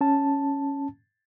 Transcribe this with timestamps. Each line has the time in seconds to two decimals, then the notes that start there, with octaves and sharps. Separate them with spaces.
0.01 C#4 A5